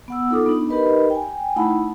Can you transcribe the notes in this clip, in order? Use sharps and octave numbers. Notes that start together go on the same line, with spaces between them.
B3 F#5 E6
D#4 F4 A4 D6 D#6
B3 D4 D#4
D#4 G4 A#4 B4 D#5 B5
G5 G#5
A3 D#4 E4 F#5 A5 B5